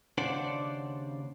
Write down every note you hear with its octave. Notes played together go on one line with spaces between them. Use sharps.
D#2 C#3 D4 C5 D5 F#5